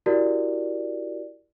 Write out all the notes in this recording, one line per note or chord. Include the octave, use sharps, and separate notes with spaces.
E4 F#4 G4 A#4 D5